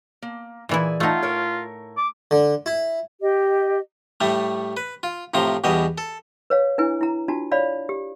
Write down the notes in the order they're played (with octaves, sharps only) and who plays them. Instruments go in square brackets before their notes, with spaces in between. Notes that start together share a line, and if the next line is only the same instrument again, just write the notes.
[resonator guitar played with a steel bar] A#3
[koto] A#2 E3 E4 [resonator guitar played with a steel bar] G#4 D5 E5
[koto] A3 D#4 [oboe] F4 [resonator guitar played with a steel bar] A4 E5 F#5
[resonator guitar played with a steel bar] A2 A#4 C#5
[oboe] D6
[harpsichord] D3
E4
[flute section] G4 D#5
[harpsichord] A2 G3 A3
B4
F4
A2 C3 F3 A#5 C6
E2 B2 G3 D#5
A4
[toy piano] B4 C#5 F5
D4 E4 B4 G#5
E4 A#5
D4 F4 F#4 A5
C#5 D5 F5 B5
G4